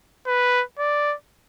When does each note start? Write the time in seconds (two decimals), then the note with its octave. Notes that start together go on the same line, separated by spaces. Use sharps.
0.27 B4
0.79 D5